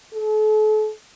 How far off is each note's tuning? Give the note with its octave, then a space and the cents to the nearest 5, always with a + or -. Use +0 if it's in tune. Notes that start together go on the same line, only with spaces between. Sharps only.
A4 -40